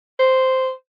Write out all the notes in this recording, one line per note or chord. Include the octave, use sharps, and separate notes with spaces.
C5